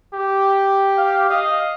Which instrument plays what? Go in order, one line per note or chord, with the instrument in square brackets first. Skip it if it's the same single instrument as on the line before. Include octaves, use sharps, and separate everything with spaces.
[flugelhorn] G4
[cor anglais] F5
[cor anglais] D#5 [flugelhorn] F5